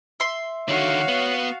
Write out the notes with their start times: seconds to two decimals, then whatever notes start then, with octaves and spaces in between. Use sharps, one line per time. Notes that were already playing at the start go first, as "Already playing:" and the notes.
0.20 E5 C6
0.68 D3 D#3 F#4 C#5 F5
1.08 B3